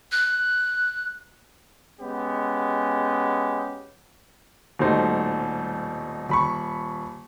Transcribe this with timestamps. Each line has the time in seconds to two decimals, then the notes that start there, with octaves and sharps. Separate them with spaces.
0.12 F#6
2.00 G#3 B3 C#4 G4
4.79 D#1 B2 G3 A3 D#4 C5
6.29 D#1 B5 C#6